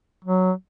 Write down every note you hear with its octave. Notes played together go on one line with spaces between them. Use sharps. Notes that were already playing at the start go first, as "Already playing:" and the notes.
F#3